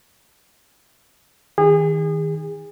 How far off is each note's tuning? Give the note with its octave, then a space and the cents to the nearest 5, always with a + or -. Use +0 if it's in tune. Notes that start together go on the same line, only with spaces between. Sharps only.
D#3 +20 G#4 -30